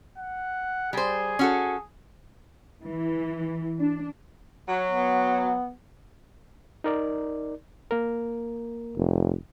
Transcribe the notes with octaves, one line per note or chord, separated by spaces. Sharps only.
F#5
G3 G#4 C5
C#4 F#4 A4
E3
D4
F#3
B3
D#4 A#4 D5
A#3 A#4
F1